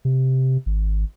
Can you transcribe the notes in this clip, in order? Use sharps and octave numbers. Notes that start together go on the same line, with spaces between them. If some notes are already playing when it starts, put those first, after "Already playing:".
C3
G#1